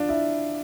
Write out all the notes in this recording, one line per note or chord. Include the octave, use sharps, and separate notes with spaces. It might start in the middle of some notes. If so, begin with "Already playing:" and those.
Already playing: D4 F4
E4